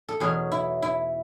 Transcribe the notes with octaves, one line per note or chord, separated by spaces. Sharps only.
A4
E2 B2 F#3 C#4 G#4
E4
E4